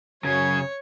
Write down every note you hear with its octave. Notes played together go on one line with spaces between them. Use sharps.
F#2 C#3 F#3 C#5 G#6